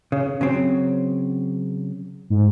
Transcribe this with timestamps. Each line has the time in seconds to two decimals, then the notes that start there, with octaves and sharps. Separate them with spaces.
0.12 C#3
0.41 C#3 F#3 C4
2.30 G#2